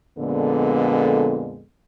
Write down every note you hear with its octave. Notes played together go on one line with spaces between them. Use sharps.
F2 A#2 D3 G#3 B3 A4